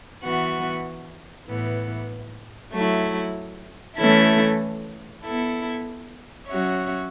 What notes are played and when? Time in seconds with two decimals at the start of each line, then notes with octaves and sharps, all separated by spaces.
0.21 E3 B3 F#4
1.47 A2 E3 B3
2.71 F#3 A3 E4
3.96 E3 A3 C#4 E4 A4
5.22 B3 E4 A4
6.47 F#3 C#4 F#4 C#5 E5